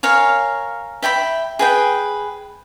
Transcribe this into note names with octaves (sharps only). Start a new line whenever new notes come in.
A#4 C#5 F5 G#5
E5 G5 G#5 B5
G#4 B4 G5